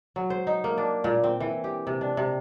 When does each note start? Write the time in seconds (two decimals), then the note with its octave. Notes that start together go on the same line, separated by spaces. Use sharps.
0.16 F#3
0.30 C5
0.47 D#4
0.64 A#3
0.78 D4
1.04 A#2
1.24 C4
1.40 E3
1.64 G4
1.87 C3
2.01 D4
2.17 C3